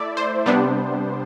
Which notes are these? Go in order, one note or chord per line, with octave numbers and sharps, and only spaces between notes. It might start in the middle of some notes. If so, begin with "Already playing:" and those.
Already playing: A3 E4 D5 E5
C5
C3 G3 B3 D4